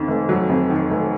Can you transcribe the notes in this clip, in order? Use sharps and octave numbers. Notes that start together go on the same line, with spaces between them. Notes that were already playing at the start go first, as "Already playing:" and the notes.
Already playing: F2 D#3
F1
F#3
F2
D#3
F1